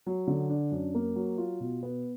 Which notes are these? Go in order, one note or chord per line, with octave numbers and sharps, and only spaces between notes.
F#3
D3
D4
F#2
A#3
F#3
F4
B2
B3